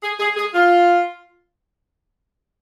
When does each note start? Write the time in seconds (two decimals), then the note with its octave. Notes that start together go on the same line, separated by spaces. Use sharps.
0.03 G#4
0.20 G#4
0.36 G#4
0.54 F4